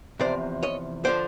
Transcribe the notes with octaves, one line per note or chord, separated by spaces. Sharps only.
E2 C3 F3 C5 D5
C#5 D#5
D3 F3 C5 D5